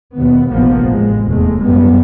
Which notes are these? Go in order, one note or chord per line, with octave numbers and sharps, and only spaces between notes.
D#2 B2 B3
F1 A#1 F3 A#3 B3
A1 G#3
F1 E2 G#3 A3
F#2 G3 G#3 B3